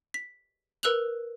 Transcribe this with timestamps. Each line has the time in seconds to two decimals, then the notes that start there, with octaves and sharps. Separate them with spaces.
0.14 B6
0.83 A#4 B4 E6 F#6 F7 F#7